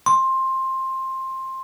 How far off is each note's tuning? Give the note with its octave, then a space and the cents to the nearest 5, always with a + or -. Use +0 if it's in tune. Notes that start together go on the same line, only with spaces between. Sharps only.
C6 +15